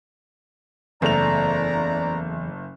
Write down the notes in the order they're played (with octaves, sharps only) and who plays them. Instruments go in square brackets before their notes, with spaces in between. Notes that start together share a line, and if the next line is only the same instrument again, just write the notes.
[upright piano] F#1 A3 F7 [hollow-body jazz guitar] E2 [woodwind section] D5 A#5